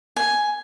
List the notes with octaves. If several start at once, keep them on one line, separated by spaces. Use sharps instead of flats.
G#5